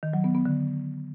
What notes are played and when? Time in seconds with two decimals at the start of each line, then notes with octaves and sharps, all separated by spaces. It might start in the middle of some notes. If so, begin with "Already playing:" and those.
0.03 D#3
0.13 F#3
0.24 B3
0.35 B3
0.46 D3